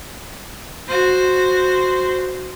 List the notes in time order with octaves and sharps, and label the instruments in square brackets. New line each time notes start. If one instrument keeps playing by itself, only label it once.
[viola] F#4 C5